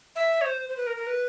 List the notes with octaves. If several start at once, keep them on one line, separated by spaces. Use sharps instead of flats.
E5
C#5
C5
C5
B4
A#4
A#4
B4